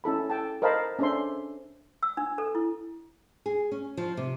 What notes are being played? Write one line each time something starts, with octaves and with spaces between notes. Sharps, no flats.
C#4 E4 A4 B5
A4 G5 A5
A#4 C5 D#5 F5 A5 B5
C#4 D4 A4 C5 E5 C6
E6
D4
A4
E4
G#4
C#4
F3
C3